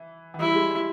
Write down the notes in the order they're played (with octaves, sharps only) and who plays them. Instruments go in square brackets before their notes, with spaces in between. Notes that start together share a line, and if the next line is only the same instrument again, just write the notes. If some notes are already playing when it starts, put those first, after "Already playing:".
Already playing: [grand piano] E3
E3
[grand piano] G3 [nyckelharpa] E4
[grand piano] G3
G#3
G3